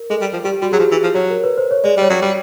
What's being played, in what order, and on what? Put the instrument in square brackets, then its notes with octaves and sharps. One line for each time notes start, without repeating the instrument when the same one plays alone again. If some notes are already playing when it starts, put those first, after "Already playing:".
Already playing: [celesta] A#4
[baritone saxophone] G#3 [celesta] A4
[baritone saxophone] G3
F3
[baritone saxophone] G3 [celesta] G4
[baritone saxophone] G3 [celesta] F#4
[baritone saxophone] F#3 [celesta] G#4
[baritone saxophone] F3 [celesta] G4
[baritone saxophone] E3
F3
[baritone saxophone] F#3 [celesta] C#5
[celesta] A#4
B4
C5
C#5
[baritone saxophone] G#3 [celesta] D5
[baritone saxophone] G3 [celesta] C#5
[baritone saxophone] F#3
G3